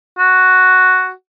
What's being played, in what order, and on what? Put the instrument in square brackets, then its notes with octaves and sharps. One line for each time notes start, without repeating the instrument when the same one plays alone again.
[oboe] F#4